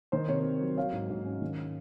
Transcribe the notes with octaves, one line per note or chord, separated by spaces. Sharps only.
D#3 C5
C3 A#4 C#5
C3
F#3
F#3 C#5 F5
G#2
G#2
C#4
D#3